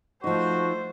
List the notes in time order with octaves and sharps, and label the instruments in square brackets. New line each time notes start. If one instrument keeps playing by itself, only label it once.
[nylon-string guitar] F3 D#4 [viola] A3 C5 [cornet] F#4